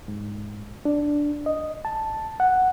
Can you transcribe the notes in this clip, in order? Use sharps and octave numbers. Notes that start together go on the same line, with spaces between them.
G#2
D4
D#5
A5
F#5